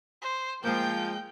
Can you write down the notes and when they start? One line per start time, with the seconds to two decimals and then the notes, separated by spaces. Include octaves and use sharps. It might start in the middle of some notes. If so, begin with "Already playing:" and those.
0.22 C5
0.64 F3 G#3 A#3 G5 G6